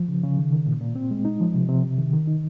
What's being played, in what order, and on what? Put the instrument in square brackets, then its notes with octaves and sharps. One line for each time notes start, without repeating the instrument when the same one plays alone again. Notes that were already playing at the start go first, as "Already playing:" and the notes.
Already playing: [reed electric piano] F3
C#3
C#3
D#3
D#3
A#2
A#2
C4
G#3
D#4
F3
C3
C3
C3
D#3
D#3
D#4